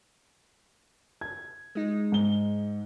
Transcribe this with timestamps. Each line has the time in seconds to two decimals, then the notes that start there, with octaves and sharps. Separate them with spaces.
1.21 G#6
1.75 G#3 D#4
2.12 G#2 G7